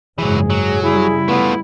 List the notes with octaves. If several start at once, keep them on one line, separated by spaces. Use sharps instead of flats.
F#1 G#2 E3 F#3 G#3 G#4
F#3
C#3 G3 E4 G#4
A3 B3 F4